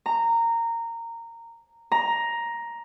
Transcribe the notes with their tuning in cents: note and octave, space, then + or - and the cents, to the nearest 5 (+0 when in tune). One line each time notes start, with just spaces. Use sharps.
A#5 -15
A#5 +10